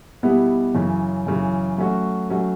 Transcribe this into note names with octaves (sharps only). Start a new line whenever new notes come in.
B2 G3 B3 E4 G#4
F#2 C#3 E3
F#2 C#3 E3
F#3 A3 C#4 F#4
F#3 A3 C#4 F#4